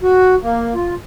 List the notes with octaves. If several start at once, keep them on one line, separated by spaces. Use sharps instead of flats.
F#4
A#3
F4